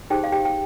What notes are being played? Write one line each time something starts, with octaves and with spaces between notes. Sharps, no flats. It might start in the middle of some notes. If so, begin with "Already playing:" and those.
D#4 G4 G#4 C5 G5
F5
G4 G5
G5